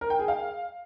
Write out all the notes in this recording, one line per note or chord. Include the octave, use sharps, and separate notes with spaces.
A#4
G5
G#4
F5